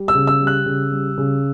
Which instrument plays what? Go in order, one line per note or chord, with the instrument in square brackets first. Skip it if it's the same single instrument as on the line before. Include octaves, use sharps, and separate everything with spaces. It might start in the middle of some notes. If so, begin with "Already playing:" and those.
Already playing: [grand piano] G3
E6
C#3
E6
G3
F#6
C#3
G3
C#3